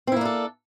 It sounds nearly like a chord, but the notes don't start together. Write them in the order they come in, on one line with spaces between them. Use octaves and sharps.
C4 E4 A#3 D4 A4